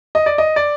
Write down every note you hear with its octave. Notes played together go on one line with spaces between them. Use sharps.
D#5
D5
D#5
D5